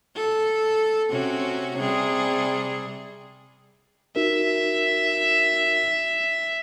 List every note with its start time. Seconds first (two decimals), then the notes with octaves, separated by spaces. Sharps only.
0.15 A4
1.10 C3 C#4 F#4
1.78 C3 G3 G#4
4.16 D#4 F#4 A#4 E5